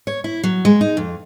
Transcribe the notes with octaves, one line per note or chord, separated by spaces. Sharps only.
C#5
E4
F#3
G#3
D#4
F2